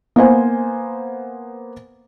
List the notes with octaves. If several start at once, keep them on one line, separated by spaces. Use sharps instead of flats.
A#3 B3 C5 G#5